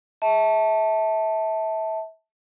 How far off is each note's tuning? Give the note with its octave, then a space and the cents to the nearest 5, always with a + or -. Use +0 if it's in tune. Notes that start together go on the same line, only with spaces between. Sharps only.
E5 -30 A5 +0